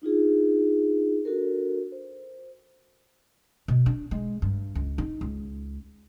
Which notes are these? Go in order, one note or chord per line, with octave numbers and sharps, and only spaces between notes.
D4 D#4 F4 G#4
D4 F#4 A4 A#4
C5
B2
D4
G#3
G2
C#2
D#4
C#2